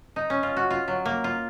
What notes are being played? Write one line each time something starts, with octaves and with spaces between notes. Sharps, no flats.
D#4
C#4
F4
F#4
F4
F#3
A#3
F4